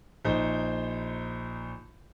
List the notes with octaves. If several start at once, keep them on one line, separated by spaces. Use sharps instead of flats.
A#1 D#4 C5